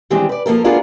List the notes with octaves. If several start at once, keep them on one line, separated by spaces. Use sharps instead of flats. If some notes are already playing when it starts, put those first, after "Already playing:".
D#3 E3 G3 G#3 C4 D4
B4 D5
F3 A#3 A4 A#4
B3 D4 F4 G#4 A#4